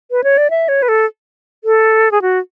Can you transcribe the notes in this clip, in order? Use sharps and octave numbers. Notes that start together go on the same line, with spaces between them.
B4
C#5
D5
E5
C#5
B4
A4
A4
G#4
F#4